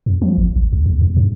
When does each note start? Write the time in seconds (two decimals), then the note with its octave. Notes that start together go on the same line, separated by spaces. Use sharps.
0.06 F2
0.22 F3
0.38 G1
0.56 G#1
0.73 C#2
0.86 D#2
1.01 E2
1.17 G2